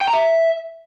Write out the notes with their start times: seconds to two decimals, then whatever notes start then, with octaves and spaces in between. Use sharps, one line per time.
0.01 G5
0.07 A#5
0.14 E5